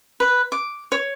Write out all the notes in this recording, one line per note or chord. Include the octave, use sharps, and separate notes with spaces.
B4
D6
C#5